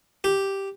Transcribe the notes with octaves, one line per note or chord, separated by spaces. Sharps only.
G4